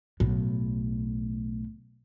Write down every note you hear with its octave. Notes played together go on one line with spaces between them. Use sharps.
B1 A2